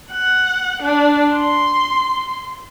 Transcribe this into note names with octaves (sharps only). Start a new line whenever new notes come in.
F#5
D4
C6